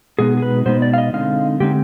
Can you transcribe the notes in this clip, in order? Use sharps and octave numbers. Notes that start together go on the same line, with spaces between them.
B2 G#3 B3 D#4 G#4
G#4
B4
B2 G#3 B3 D#4 C5
D5
F5
D#5
D3 G#3 C4 D#4 F5
D3 G#3 C4 D#4 G4